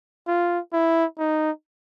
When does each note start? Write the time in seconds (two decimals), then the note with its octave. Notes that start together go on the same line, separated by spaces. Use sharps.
0.27 F4
0.73 E4
1.19 D#4